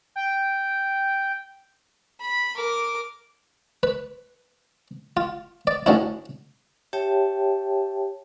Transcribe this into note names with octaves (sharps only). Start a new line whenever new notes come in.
G5
B5
A#4 D6
B4
F4
D5
D2 D3 C#4 E4
G4 C#5 E5 G5 A5